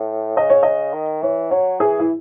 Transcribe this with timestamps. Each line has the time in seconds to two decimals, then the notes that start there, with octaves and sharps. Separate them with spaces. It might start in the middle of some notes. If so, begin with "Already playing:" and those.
Already playing: A2
0.36 C#3 D#5
0.50 C#5
0.63 C#3 D#5
0.94 D#3
1.22 E3 C#5
1.51 F#3 C#5
1.79 E3 G#4
2.00 E4